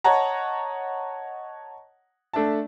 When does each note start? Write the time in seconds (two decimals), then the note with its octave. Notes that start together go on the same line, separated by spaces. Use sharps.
0.04 C#5 D#5 F#5 A5 A#5
2.33 A3 D4 E5 A5